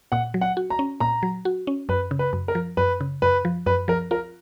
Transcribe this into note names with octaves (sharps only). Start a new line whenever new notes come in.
A#2 F#5
F#3
F#5
F#4
A#5
C#4
A#2 A#5
F#3
F#4
C#4
F#2 B4
C#3
B4
F#2
A#4
F3
F#2 B4
C#3
F#2 B4
F3
F#2 B4
F3 A#4
F4 A#4